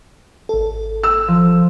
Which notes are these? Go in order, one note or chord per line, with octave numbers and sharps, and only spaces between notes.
G#1 A4
E6
F3